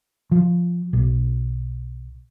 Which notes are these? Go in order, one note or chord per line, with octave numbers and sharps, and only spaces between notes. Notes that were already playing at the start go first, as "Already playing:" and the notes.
F3
B1